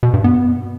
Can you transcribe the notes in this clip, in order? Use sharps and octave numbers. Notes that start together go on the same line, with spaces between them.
B2
G2
B3